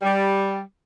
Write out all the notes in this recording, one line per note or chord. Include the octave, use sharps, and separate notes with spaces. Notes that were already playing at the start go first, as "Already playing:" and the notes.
G3